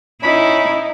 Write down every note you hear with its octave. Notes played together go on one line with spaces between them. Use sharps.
C#4 D#4 E4 B5